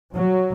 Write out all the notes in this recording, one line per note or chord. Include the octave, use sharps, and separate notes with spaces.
F#3